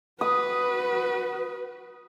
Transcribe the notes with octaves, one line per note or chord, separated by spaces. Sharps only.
F#4 B4 D#6